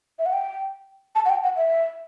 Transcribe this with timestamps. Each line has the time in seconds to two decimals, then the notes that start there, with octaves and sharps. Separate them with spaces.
0.19 E5
0.26 F#5
0.33 G5
1.15 A5
1.25 F#5
1.30 G5
1.44 F#5
1.57 E5